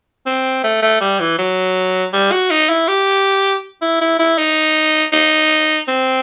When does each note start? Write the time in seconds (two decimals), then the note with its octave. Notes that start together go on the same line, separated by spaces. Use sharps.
0.26 C4
0.64 A3
0.82 A3
1.00 G3
1.19 E3
1.38 F#3
2.13 G3
2.32 F#4
2.50 D#4
2.69 E4
2.88 G4
3.82 E4
4.01 E4
4.19 E4
4.38 D#4
5.12 D#4
5.88 C4